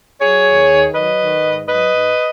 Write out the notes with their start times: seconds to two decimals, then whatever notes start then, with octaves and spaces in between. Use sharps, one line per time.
0.20 F#3 G#4 C#5
0.45 D#2
0.70 D#3
0.94 F#3 B4 D#5
1.20 D#3
1.44 G#2
1.68 F#3 B4 D#5
1.93 G#2